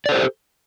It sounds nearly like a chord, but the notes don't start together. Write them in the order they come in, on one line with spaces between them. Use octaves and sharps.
D5 A4 C5 G4